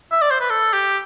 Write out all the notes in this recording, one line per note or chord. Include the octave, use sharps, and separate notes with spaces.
E5
D5
C5
B4
A4
G4